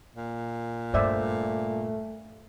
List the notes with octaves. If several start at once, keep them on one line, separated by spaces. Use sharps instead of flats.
A#2
G2 A3 C5 D5 E5